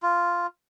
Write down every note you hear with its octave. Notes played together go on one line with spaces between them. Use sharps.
F4